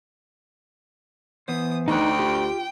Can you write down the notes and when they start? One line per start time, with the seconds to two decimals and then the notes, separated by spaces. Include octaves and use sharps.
1.48 E3 B3 C5 D#6
1.88 D2 D#4 G5 F#6
2.20 F4 G4